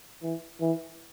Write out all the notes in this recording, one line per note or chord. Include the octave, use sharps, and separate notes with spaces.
E3
E3